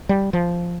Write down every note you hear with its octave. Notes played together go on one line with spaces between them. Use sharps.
G3
F3